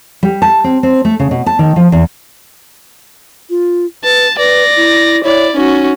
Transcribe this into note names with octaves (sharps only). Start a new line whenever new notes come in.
G3
A5
C4
C4
A3
C#3
B2
A5
D#3
F3
E2
F4
B4 A5
B4 D5 A#6
E4
E4 C#5 D5
C#4 D#4 F#4